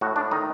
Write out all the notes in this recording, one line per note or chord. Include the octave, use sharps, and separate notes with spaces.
A2 F#4
A2 D4
D#3 D#4